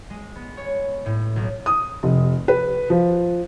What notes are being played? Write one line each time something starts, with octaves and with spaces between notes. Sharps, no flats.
G#3
B3
C#5
A2
B1
D#6
F1
B4
F3